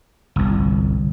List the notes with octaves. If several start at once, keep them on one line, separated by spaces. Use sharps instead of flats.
G1 C2